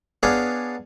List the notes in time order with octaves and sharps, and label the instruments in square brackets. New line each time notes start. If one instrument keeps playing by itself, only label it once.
[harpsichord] B3 D4 G#4 C#5 F5